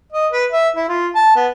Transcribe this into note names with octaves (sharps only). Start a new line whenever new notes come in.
D#5
B4
E5
E4
F4
A5
B3